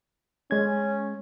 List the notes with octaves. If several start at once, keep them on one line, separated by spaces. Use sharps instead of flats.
G#3 C#4 G#6